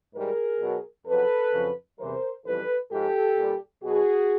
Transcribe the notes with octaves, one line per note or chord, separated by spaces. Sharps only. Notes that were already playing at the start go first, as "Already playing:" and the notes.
G#2 E3 G3 G#4 A#4
B2 F#3
F2 C#3 F#3 A4 B4
F2 C#3 F#3
E2 C3 E3 G3 A#4 C5
F2 C#3 E3 G3 A4 B4
G#2 F3 G4 A4
A#2 G3
B2 F#3 F#4 G#4